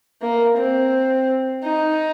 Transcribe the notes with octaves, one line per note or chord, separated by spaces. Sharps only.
A#3
C4
D#4